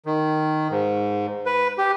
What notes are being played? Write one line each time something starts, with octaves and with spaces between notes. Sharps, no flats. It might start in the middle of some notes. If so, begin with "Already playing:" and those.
D#3
G#2
B4
G4